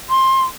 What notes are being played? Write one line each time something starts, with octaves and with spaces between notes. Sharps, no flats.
C6